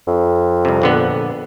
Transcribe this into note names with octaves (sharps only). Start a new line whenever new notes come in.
F2
C2 C3
A#1 D3 B3